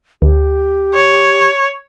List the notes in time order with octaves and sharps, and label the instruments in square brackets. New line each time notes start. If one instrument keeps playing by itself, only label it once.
[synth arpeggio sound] D2 [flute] G4
[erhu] C#5